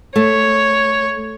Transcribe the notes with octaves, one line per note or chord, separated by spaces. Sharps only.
A3 C#5